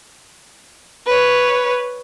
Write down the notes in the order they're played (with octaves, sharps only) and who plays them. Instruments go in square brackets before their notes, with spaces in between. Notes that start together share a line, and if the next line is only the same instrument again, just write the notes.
[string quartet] B4 C#5